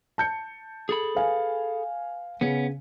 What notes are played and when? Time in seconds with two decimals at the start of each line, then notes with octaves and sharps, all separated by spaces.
0.18 A5 G6 C#7
0.89 G#4 A4 B5
1.15 B4 F5 G#5
2.41 C#3 B3 C#4